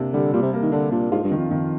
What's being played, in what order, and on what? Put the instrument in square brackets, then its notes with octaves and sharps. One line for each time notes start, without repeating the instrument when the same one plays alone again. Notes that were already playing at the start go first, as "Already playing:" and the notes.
Already playing: [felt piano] C3 A#3 D4
[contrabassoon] D3 [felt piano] G3
[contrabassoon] A#2 [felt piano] G3
[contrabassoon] C3
[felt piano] A#3
[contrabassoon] D#3
[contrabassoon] D3 [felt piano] D4
[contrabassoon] A#2 [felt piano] D4
[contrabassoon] G#2 [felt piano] F4
[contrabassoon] G2
[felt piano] D#3
[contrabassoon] F2
[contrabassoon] F2 [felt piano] D#3